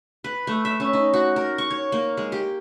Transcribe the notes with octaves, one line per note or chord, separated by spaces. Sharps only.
B4
A3
E5
C#4
D#4
F#4
A#4
C#6
C#5
A#3
G#3
G4